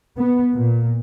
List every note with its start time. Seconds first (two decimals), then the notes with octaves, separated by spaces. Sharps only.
0.18 B3
0.54 A#2